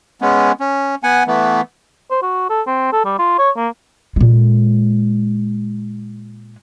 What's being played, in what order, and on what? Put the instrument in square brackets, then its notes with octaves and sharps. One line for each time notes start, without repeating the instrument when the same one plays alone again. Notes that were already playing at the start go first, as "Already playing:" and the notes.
[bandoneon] G#3 B3 C#4
C#4
B3 F#5 G#5
E3 A3 B3
[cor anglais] C5
F#4
A4
C4
A4
G3
F4
C#5
A#3
[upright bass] A#2 G#3